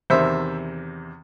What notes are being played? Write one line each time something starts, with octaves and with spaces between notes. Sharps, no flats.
E2 C3 D#3 C5 E5